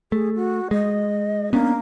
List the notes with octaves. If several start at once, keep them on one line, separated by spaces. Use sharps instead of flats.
A3 G#4
F#4
G#3 D#5
A#3 B3 C#4 D4